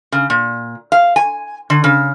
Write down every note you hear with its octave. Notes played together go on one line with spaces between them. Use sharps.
C#3
A#2
F5
G#5
D3
C#3